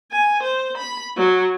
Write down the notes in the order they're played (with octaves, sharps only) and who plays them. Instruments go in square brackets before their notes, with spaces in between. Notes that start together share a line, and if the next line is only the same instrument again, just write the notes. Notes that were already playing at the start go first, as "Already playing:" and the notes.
[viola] G#5
C5
B5
F#3